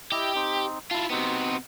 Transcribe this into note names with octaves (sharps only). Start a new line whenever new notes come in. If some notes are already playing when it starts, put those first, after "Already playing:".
E4 G4 D#5
C4 D#4
E4 F4 A5
C3 B3 C4 D#4 F#4